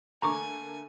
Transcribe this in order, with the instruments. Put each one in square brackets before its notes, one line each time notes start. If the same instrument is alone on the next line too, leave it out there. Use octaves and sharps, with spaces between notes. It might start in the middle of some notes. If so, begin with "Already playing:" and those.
[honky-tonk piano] D3 A3 A#3 [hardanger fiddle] G#5 [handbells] A#5 C#6 D6